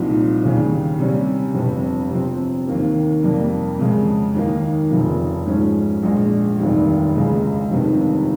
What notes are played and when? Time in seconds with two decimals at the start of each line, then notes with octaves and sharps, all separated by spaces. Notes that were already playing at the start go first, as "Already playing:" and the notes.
Already playing: C2 A#2 F3 C4 D#4
0.43 D#2 C#3 G3 C#4
0.99 C3 G3 C#4
1.55 G1 F2 C3
2.11 C3 F3 C4
2.67 D#2 D#3 A#3
3.23 F2 C3 G3 A#3
3.79 F2 C#3 G#3
4.35 D#2 D#3 A#3 D#4
4.91 F1 F2 C#3 F3
5.46 G#2 F3 G#3 C#4
6.03 A#1 A#2 G#3
6.59 F1 D#2 D#3 G3
7.15 C#2 C#3 G#3
7.71 G1 F2 C3 D#3